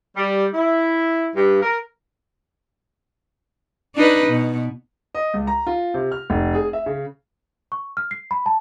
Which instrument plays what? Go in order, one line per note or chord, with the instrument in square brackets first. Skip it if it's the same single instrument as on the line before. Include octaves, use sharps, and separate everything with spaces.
[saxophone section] G3
E4
G2
A#4
[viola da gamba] D4 D#4 B4
B2
[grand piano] D#5
C#2
A#5
F4
C3
F6
F1
G#4
E5
C#3
[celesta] C#6
F6
C7
B5
A5